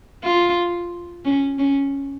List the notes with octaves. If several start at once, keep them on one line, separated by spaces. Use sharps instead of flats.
F4
C#4
C#4